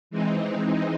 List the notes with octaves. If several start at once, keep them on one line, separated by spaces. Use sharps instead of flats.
E3 G#3 C4 D#4